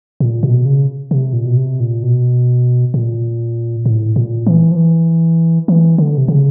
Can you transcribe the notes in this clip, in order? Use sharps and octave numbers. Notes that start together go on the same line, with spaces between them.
A#2
B2
C#3
C3
A#2
B2
C3
A#2
B2
A#2
A2
A#2
E3
F3
E3
E3
D3
C3
C#3